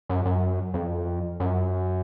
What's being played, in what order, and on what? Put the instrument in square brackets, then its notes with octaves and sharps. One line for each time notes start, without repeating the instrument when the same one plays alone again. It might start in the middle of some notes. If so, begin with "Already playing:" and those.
[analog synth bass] F#2
F#2
F2
F#2